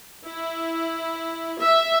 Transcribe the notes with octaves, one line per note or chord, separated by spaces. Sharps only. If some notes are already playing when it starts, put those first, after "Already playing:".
E4
E5